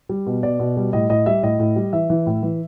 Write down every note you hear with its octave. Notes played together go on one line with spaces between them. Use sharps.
G3
B2
B2 D5
B2
G3
A2 D#5
A2 D#5
G3 E5
A2 D#5
A2
G3
E3 E5
E3
A2
E3